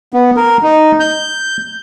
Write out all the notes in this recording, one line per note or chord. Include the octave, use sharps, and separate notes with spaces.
B3
A#4
D#4
G6